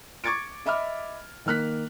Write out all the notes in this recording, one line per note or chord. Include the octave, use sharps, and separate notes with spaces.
C#6 D6 G#6 A6 C#7 D7
D#5 E5 B5 D6 F6
D#3 A#3 F6 F#6 B6